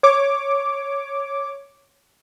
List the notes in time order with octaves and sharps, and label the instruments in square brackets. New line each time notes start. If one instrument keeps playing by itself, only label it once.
[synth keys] C#5 D6